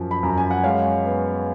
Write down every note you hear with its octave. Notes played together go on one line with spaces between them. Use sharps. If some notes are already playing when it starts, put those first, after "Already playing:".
Already playing: F#2 F3
B5
F#2 A#5
G#5
F#5
G#3 C#5 F5
B3